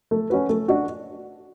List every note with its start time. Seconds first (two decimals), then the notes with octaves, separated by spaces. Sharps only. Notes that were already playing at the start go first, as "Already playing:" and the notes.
0.11 A3
0.30 C#4 F#4 B4
0.49 A3
0.68 D4 F#4